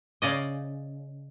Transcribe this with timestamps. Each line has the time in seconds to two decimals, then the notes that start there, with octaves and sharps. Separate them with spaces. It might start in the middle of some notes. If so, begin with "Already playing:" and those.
0.22 C#3 D5 D#5